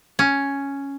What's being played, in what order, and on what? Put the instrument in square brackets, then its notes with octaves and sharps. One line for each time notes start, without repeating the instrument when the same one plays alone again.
[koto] C#4